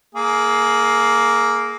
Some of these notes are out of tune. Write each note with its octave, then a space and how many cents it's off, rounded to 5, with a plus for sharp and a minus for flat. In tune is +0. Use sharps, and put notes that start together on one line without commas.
A#3 +0 G#4 +20